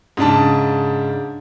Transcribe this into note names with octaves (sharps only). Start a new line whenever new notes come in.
G#2 C#3 D4 A5